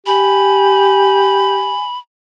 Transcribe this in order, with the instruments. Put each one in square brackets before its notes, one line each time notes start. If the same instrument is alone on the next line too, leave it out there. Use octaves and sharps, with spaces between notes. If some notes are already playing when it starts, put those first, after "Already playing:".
[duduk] G4 [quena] G#5 [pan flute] B5